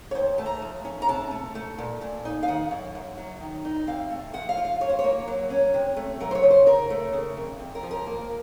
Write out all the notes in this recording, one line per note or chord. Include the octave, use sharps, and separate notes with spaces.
C#5
D#2 C5
A3 A5
A#5
F3
C#4
A#5
C3 A5
A3
A3
A#2
A#2
D#4
F5
D#3 F#5
F#2
F#2
F#3
D#3
D#4
C3 F5
A3
F3 F#5
F5
F4
F5
F#2 C#5
C5
C#5
A#3
F#3
C#4
C3
A3
F#3 A#4
C5
C#5
C#3
C5
C#3 A#4
A3
C#3
F2
F2
A#4
F3
A#4
A#3